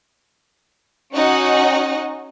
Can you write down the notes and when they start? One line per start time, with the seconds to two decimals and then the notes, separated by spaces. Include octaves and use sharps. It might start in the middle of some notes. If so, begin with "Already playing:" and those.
1.13 C#4 D#4 F#4 D#5 F#5